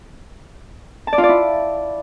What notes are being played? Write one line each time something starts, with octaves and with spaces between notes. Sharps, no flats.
A5
D5
F4
D5
E4